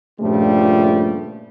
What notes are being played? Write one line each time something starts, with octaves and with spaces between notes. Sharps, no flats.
G2 A#2 C#3 F3 G3 A3